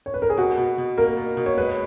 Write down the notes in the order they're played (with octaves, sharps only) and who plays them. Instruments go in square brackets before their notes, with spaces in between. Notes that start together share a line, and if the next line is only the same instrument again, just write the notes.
[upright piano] C#5
B4
A#4
G#4
[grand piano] B2 [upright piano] F#4
[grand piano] B2
B2
[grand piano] A#3 [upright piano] A#4
[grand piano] B2
B2
[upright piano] C#5
[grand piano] G#3 [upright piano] B4